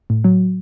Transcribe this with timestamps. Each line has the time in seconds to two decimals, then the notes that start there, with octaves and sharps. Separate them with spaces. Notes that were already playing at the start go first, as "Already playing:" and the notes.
0.10 A2
0.24 F#3